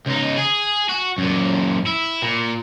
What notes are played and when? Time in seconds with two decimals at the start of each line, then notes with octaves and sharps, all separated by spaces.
0.07 C#2 D#4
0.38 G#4
0.89 F#4
1.18 F#2 A#2
1.86 E4
2.22 A#2